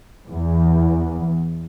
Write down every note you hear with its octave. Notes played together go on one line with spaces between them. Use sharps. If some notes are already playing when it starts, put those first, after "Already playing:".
E2